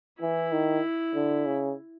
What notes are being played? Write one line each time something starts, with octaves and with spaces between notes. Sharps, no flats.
E3 E4
D#3
D3
C#3